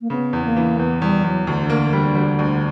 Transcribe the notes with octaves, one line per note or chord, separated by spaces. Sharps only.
A#3
C#3 B3
E2
A#3
E3
E2 B3
E2 G3
E2 F#3
D2 D3
A#3
G3
G3
D2